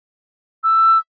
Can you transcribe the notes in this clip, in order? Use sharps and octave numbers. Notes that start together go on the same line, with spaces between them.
E6